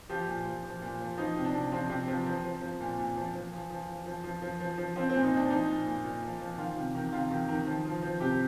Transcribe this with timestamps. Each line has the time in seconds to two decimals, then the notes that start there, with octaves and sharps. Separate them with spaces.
0.09 F3 G4
0.27 A#2
0.45 F3
0.64 F3
0.82 A#2
1.00 F3
1.17 F3 D#4
1.36 C3
1.45 D4
1.54 C3
1.72 F3 C4
1.90 C3
2.08 F3
2.26 F3
2.44 F3
2.61 F3
2.80 A#2
2.98 A#2
3.16 F3
3.34 F3
3.52 F3
3.70 F3
3.88 F3
4.06 F3
4.24 F3
4.42 F3
4.60 F3
4.78 F3
4.96 F3 C4
5.10 A#2 C4
5.23 D#4
5.32 A#2 D4
5.50 F3 D#4
5.69 A#2
5.87 A#2
6.04 A#2
6.22 F3
6.40 F3
6.58 D#3 F4
6.77 C3
6.95 D#3
7.12 C3 F4
7.31 D#3
7.49 D#3
7.66 F3
7.85 F3
8.03 F3
8.20 C3 G4